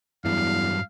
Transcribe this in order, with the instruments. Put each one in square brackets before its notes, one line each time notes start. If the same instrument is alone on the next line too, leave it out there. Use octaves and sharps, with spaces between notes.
[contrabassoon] E2 [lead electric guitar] G2 F#3 [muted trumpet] F5